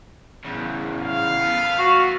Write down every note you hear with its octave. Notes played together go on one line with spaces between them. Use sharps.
E2 C#3
F5
B3 A4
F#4